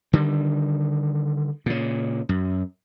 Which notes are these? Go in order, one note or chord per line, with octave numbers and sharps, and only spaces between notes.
D3 D#3 G3
A#2 C#3
F#2